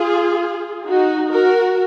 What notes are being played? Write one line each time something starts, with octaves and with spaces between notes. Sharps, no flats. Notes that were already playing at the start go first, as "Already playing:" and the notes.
Already playing: F4 G#4
D#4 F#4
F#4 A#4